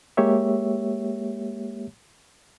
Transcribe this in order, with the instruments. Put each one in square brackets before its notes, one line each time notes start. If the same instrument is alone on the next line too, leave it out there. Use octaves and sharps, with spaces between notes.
[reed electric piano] G#3 A#3 G4 C#5 E5